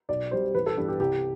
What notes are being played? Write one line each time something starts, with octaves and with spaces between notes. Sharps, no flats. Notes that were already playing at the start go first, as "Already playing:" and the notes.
B1 D5
B2 G3 C4 C5
A1 B4
A4
G2 E3 B3 G4
G4
C2 G4